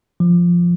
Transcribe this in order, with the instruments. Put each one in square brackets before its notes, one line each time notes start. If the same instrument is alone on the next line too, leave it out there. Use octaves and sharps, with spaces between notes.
[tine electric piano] F3